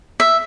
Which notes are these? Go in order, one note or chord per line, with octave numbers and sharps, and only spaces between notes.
E5